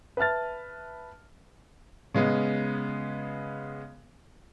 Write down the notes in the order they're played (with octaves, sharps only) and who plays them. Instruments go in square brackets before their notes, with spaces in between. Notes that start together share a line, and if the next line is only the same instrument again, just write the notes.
[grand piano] B4 E5 A5 F6 A6
C#3 G#3 B3